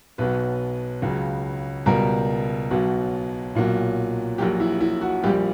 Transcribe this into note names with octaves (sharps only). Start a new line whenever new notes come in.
B1 B2 F#3 B4
C#2 C#3 F#3
C#2 B2 G3 A#4
B1 B2 F#3
B1 A#2 F#3
A#1 A#2 F#3 G4
E4
E4
F#4
A#1 A#2 G3 G4